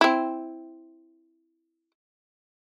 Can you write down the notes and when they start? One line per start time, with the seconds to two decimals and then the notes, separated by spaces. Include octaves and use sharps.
0.01 C4 E4